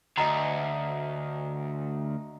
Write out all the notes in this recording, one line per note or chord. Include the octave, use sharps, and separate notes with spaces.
D2 D#5 A#5